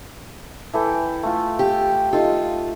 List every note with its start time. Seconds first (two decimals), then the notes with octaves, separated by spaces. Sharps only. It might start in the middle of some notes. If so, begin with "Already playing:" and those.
0.73 E3 A4 G5
1.23 A3 F4
1.59 G4
2.13 D#4 F4 A4